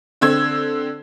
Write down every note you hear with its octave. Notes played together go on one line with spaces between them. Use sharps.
D3 C4 E6 G#6